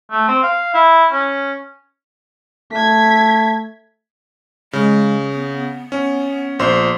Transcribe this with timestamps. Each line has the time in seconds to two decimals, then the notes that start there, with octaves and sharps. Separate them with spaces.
0.11 A3
0.28 C4
0.43 F5
0.74 E4
1.12 C#4
2.72 A3 G#6 B6
4.73 C#3 G#3
5.33 B3
5.92 C#4
6.59 A#1 C5 C6